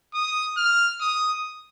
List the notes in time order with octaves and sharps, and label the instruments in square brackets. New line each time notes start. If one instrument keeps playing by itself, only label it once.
[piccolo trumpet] D#6
F6
D#6